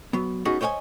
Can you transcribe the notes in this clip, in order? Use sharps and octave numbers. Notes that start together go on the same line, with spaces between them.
F#3 B3
B3 C#4 D#4 F#4 G#4
C5 C#5 D#5 F5 G#5